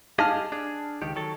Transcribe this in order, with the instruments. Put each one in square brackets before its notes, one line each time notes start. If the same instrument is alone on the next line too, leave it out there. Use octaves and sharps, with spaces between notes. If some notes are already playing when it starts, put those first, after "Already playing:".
[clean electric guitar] G4 G#4 D#5 [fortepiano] F5 A5 F6
[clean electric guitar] D4 G#4
C#2 D#3 G4
D#3 F#3 A4